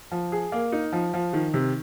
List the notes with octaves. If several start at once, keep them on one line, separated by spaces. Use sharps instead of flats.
F3
G#4
A#3
D#4
F3
F3
D#3
C3